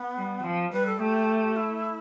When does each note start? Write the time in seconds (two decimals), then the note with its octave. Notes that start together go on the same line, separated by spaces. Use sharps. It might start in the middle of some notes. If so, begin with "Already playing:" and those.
Already playing: B3
0.16 G3
0.43 F3 C4
0.72 G3 B4
0.86 A4
0.99 A3 G4
1.56 E4